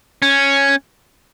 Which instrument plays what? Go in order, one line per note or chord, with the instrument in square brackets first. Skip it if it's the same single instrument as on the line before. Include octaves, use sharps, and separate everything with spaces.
[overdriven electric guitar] C#4